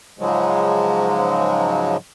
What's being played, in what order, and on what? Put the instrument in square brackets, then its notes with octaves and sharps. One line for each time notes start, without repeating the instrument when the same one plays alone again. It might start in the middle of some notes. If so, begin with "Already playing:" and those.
[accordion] G#2 C#3 F3 F#3 G#3